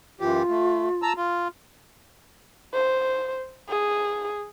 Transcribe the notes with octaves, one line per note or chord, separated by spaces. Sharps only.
F#2 E3 F4 G4
A3
A5 A#5 E6
F4
C5
G#4